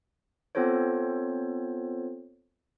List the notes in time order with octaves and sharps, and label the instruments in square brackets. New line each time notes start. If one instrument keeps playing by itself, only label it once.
[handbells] B3 C4 F4 A4 C5 C#5